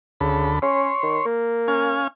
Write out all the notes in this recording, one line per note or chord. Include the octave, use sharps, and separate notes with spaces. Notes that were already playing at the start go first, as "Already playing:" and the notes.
D2 C#3 A4 B5
C#4 C#5 C6
D#3
A#3
C#4 F5 G#5